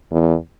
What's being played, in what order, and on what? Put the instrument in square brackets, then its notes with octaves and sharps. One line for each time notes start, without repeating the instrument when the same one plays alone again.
[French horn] E2